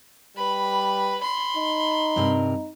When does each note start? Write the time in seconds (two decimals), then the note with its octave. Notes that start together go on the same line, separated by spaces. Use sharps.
0.37 G3 B4 B5
1.21 B5 C6
1.57 D#4
2.16 G2 C3 A#4